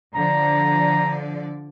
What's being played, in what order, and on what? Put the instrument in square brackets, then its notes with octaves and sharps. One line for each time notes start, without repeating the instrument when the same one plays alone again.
[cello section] D3 F3 D5 [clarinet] A#5